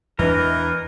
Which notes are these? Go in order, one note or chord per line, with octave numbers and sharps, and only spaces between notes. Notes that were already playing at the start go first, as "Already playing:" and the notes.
E2 E3 D4 A#4 B4 D#5 E5